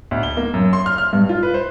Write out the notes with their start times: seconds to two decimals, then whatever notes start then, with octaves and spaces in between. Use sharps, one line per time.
0.11 D2
0.23 G7
0.37 A#3
0.54 F#2
0.73 C6
0.86 F6
0.98 F6
1.13 G2
1.29 F4
1.43 B4
1.54 C5